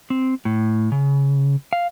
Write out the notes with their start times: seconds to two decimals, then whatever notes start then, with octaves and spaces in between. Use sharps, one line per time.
0.10 C4
0.45 A2
0.92 C#3
1.73 F5